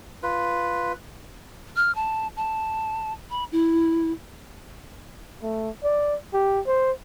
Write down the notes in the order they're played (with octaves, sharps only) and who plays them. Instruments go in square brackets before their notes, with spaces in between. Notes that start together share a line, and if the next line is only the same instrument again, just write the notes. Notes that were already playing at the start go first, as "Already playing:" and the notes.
[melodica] F4 B4
[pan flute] F6
A5
A5
B5
E4
[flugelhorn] A3
D5
G4
C5